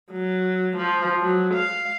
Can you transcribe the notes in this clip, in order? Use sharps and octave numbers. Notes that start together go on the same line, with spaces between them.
F#3
F3
F#3
F5